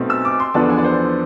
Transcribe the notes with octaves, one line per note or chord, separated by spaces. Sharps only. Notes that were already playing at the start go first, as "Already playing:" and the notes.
Already playing: B1 B2 A3 C4
E6
D6
C6
E2 D3 F3 B3 D4 A5
G#5
D5
C5